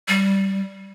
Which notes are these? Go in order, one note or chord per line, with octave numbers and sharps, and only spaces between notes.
G3